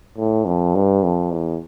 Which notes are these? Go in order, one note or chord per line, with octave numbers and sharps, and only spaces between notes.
A2
F2
G2
F2
E2